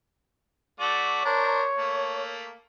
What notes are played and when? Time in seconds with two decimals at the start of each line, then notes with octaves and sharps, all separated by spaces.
0.80 A3 F#4 D5
1.25 D4 A#4 C5 C#5
1.78 A3 A#3